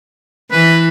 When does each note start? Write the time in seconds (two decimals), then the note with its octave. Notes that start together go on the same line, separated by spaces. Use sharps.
0.52 E3 B4